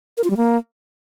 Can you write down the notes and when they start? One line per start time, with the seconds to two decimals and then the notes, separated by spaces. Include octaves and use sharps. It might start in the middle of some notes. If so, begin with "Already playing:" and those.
0.17 A#4
0.24 F4
0.30 G3
0.37 A#3